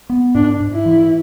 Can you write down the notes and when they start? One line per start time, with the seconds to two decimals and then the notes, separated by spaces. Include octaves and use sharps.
0.09 B3
0.35 G#2 D4
0.60 G#2
0.72 E4
0.85 E3